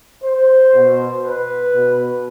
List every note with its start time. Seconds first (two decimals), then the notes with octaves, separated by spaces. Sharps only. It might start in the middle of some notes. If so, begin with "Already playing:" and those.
0.23 C5
0.74 B2
1.24 B4
1.73 B2